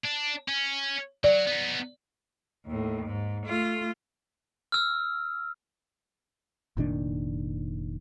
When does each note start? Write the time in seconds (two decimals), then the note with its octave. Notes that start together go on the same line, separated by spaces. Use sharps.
0.04 D4
0.48 C#4
1.24 F#3 D5
1.47 B3 D#4
2.66 D#2 A2
3.06 G#2
3.46 A3 F4
4.72 E6 F6
6.77 F1 A#2 D#3 D4